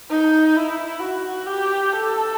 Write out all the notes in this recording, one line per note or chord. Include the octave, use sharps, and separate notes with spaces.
D#4
E4
F#4
G4
A4